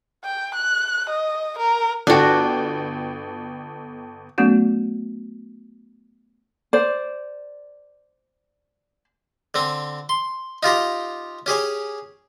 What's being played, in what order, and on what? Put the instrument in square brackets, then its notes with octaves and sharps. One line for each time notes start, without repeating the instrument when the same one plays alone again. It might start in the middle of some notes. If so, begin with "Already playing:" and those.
[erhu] G5
F#6
D#5
A#4
[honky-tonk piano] G1 A4 G5 [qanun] D4 F#4
[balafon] F#3 A3 B3 C#4 F#4
[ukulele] C5 D5
[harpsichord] D3 C4
C6
D#4 F4 G4 A#5
C#4 G4 G#4 C#5